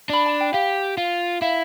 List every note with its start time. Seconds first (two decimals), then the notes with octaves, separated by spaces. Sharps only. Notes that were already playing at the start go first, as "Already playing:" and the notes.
0.10 D4 B5
0.26 A5
0.41 G5
0.53 G4 F5
0.98 F4
1.42 E4 F5